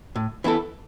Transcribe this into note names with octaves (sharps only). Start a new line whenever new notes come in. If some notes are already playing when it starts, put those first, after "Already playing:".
A2
E3 B3 E4 A4